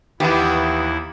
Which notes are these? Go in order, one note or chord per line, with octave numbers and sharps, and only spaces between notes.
D#2 D#3 E3 B3 E4 G4